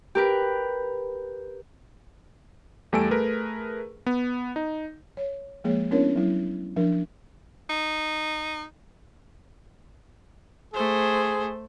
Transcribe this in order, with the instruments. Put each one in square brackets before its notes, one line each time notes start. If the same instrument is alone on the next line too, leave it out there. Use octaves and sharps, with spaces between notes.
[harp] G4 A#4 B4
[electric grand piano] E2 G3 A3 A4 G#5 D7
A3 G#4 A#4 B4
B3
D#4
[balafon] C#5
F3 G#3 A#3 G#4 C#5
B3 C#4 D4 E4 A#4 C#5
F#3 E4
F3 D4 A#4
[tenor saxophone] D#4
[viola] A3 C5 [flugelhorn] G#4